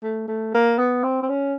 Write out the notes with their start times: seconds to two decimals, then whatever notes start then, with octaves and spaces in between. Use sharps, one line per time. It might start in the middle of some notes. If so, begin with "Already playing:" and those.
0.03 A3
0.28 A3
0.54 A#3
0.78 B3
1.03 C4
1.22 C4
1.29 C#4